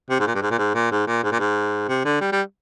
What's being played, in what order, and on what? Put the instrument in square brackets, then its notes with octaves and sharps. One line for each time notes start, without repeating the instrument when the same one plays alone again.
[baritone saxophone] C3
G#2
A#2
G2
G#2
A#2
G#2
A#2
G#2
A#2
G#2
A#2
G#2
C3
D3
G3
G3